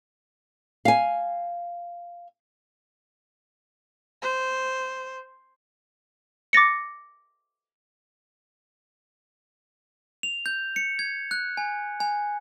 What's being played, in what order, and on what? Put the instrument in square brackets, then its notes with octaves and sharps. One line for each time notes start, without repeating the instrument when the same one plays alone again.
[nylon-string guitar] F5 G#5
[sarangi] C5
[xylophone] D6 A6 A#6 C#7
[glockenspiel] F7
G6
C#7
G#6
F#6
G#5
G#5